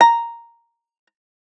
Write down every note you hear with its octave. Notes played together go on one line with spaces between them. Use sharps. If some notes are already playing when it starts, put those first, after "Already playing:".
A#5